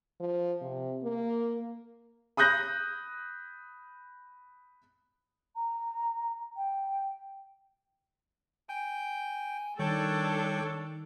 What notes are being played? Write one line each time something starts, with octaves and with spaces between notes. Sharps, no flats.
F3
C3
A#3
B5 D#6 F#6 G6 A#6
A#5
G5
G5 G#5
D#3 G3 D4 A4 C#5 G5